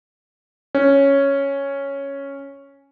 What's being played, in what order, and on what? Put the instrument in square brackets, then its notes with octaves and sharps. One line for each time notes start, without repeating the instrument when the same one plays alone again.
[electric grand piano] C#4 [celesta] C#5